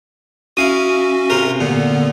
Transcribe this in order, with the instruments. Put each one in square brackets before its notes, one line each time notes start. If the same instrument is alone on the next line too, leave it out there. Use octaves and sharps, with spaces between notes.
[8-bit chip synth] C#4 F#4 [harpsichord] E4 F5 D#6
[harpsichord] C3 F4 A#4
[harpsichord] A#2 [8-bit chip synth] D3 B3